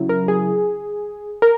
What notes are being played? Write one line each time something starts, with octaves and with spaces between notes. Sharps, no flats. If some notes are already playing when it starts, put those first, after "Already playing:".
Already playing: C#3 F#3 E4
A#4
G#4
A#4